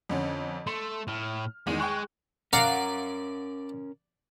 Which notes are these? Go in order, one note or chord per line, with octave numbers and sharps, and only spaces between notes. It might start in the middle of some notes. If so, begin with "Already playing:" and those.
F2 D3 C#4
A3 C6
A2 F6
E2 D#3 G#3
G#3 G5 C#6 F#6
C#4 A#4 D5 F5 F#5 A#5